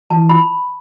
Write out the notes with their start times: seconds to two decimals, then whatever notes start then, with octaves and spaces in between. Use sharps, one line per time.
0.10 E3 A5
0.29 B5